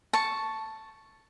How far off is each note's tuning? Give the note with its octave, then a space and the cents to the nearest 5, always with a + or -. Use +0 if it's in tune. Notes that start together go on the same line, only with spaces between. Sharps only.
A5 +0 C#6 +0